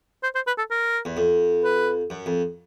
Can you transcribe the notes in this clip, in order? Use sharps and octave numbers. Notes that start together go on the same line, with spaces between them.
C5
C5
B4
A4
A#4
E2
F2
B4
F#2
F2